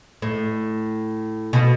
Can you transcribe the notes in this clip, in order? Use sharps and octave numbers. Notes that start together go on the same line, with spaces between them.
A2
B2